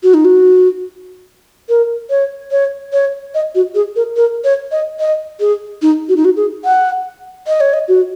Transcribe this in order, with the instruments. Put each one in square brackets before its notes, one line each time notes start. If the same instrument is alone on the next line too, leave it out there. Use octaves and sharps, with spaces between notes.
[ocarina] F#4
D#4
F#4
A#4
C#5
C#5
C#5
D#5
F#4
G#4
A#4
A#4
C#5
D#5
D#5
G#4
D#4
F#4
D#4
F#4
G#4
F#5
D#5
C#5
D#5
F#4